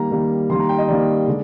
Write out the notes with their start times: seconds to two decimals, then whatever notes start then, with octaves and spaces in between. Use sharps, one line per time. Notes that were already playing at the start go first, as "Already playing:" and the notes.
Already playing: D#3 G3 A#3 A#5
0.11 D#3 G3 A#3
0.50 D#3 G3 A#3 C6
0.59 A#5
0.69 G5
0.78 D#5
0.88 D#3 G3 A#3 D5
1.27 D3 G#3